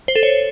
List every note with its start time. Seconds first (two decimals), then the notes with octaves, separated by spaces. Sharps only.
0.08 C5
0.16 A4
0.23 C#5